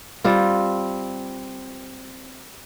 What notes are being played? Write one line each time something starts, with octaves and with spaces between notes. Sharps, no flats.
G3 C4 F4